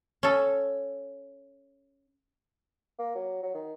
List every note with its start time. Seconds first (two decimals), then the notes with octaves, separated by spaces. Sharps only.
0.23 C#4 A4
2.99 A#3
3.15 F#3
3.43 F#3
3.54 D#3